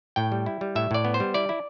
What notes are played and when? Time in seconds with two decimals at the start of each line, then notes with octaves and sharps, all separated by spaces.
0.16 A2 G5
0.32 G3
0.46 E4
0.61 G3
0.75 A2 E5
0.91 A2 D5
1.05 B3
1.14 C5
1.20 G3
1.34 E4 D5
1.49 E4